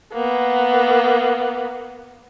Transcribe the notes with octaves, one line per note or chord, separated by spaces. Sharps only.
A#3 B3